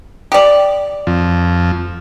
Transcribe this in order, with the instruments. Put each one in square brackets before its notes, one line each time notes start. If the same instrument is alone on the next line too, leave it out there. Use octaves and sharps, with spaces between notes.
[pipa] G4 D5
[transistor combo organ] F2